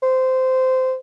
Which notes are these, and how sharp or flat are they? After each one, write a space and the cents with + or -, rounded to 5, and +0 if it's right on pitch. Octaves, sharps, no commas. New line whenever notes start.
C5 -15